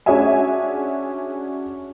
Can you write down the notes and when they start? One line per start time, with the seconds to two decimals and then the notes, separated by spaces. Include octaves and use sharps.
0.06 C#4 D4 F#4 G#4 E5 G#5